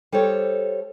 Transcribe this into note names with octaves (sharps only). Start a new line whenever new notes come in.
G3 A4 C5 C#5